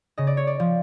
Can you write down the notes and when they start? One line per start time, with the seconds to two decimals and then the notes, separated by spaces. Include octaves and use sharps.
0.18 C#3 D#5
0.27 D5
0.37 C#5
0.47 D5
0.60 F3